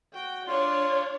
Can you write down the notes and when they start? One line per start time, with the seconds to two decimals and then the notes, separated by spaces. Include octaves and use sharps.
0.15 F#4 G5
0.47 D4 F4 C#5 D5 C6